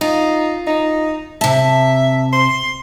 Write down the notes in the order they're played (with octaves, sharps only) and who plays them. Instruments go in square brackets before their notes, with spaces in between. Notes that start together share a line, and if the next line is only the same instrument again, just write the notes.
[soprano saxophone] D#4 [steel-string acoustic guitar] F4
[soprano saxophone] D#4
[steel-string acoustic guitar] C3 A5 [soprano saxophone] E5
[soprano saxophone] C6